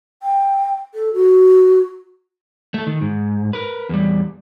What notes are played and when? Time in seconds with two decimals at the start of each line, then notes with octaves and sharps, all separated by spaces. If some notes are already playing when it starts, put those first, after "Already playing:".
0.23 G5
0.94 A4
1.14 F#4
2.74 A3 A4
2.87 D#3
3.01 G#2
3.53 A#4 B4
3.89 E2 G3